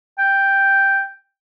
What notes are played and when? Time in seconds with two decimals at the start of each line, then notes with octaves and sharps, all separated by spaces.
0.18 G5